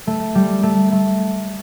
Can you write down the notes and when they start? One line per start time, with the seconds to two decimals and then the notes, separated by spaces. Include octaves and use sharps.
0.07 A3
0.35 G3
0.63 A3
0.92 A3